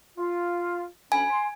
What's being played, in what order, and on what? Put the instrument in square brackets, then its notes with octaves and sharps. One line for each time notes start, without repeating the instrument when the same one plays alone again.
[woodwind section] F4
[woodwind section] D2 C#4 B5 [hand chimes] G#5
[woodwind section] C6